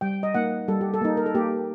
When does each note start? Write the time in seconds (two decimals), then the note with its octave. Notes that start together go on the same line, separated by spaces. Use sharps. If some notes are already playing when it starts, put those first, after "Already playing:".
0.01 G3 G5
0.23 D#5
0.34 A#3 D#4 F#5
0.68 G3 A4
0.81 G4
0.94 A4
1.01 A#3 D#4
1.17 A#4
1.26 A4
1.35 A#3 G4